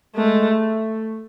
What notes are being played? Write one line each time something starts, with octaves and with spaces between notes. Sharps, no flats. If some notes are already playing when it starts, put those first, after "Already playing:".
G#3 A3
A3